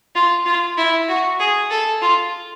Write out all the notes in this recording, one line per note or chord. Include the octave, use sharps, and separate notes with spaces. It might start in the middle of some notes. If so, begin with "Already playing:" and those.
F4
F4
E4
F#4
G#4
A4
F4